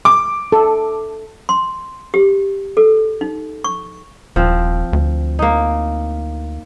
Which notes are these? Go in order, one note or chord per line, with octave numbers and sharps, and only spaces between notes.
D6
A4
C6
G4
A4
D#4
C#6
D#1 F3 C4
D2
A#3 D#4